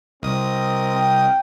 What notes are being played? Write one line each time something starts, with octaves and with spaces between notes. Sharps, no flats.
C2 C4 A#4 D#5 D#6
G5